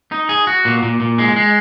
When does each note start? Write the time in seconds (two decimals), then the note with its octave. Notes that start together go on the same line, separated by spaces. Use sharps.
0.12 D#4
0.29 G#4
0.47 F#4
0.65 A#2
0.83 A#2
1.00 A#2
1.18 G#3
1.36 G#3